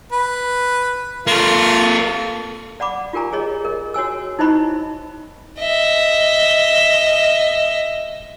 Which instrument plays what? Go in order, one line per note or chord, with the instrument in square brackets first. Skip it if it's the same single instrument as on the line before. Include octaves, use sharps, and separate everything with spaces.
[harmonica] B4
[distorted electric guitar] A#3 A4 [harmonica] F4
[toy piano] D5 F#5 B5 D6
F4 G4 A#4 G#5 A#5
G#4 C#5 D#5
A#4 D#5
F#4 C#5 G#5 E6
D#4 E4 C5 D#5 B5 C#6
[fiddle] D#5 E5